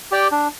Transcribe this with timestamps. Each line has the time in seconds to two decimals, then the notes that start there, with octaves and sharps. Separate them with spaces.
0.12 G4 D5 G5
0.32 D4